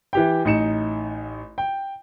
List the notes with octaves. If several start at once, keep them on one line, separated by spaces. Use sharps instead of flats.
E3 G4 G5
A1 D#4 C#7 E7
G5